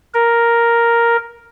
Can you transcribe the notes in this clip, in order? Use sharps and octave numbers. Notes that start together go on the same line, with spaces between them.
A#4